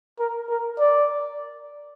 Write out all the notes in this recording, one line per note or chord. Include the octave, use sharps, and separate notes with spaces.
A#4
A#4
D5